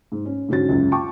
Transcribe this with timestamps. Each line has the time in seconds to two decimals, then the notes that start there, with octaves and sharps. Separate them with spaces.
0.12 G#2
0.25 C#4
0.49 G#2 D3 C#4 F#4 A6
0.69 C#2 F#2 C#3
0.92 F4 G5 A5 C#6 D6